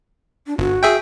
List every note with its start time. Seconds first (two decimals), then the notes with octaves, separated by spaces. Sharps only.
0.47 D4
0.58 G1 F#4
0.83 G#4 E5 G5